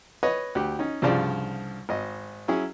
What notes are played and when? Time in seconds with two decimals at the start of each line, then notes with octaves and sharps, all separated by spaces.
0.23 B4 C#5 D#5
0.55 D2 G4
0.79 C#4 D#4
1.02 C2 G2 C#3 F3 D5
1.89 G#1 D#5
2.48 F#3 C#4 E4 G#4